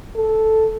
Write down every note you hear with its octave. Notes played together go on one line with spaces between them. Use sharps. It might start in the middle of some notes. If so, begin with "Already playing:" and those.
A4